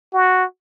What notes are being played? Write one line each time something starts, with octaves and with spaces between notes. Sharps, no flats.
F#4